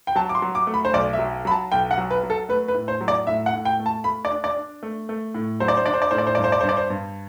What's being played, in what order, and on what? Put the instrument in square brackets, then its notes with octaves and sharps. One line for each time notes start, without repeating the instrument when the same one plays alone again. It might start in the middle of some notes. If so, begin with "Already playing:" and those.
[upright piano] G5
[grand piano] F#3 [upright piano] A5
[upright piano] D6
C6
[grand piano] F#3
[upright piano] D6
[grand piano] A3
[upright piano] B5
C5
[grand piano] B1 [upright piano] D5
[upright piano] E5
[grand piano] F#3
[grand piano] F#3 [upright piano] B5
[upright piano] A5
[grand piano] B1 [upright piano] G5
[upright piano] F#5
[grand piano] F#3
[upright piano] B4
[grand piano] F#3
[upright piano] A4
[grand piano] A3 [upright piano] B4
[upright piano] B4
[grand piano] A2
[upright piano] C5
[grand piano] F#3
[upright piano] D5
[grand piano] A2 [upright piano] E5
[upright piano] F#5
[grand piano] A2
[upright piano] G5
[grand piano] A3
[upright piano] A5
[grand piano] A3 [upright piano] B5
[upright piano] D5
[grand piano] D4
[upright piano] D5
[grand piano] D4
A3
A3
A2
[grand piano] F#3 [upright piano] C5
[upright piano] D5
C5
[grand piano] D4 [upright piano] D5
[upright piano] C5
D5
[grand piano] A2 [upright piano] C5
[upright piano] D5
C5
[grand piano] G2 [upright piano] D5
[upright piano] C5
D5
[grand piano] G2 [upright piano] C5
[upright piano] D5
C5
[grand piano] G2